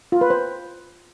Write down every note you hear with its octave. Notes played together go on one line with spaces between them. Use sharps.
F4
B4
C5